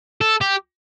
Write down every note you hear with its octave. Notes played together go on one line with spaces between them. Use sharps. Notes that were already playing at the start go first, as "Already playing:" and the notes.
A4
G4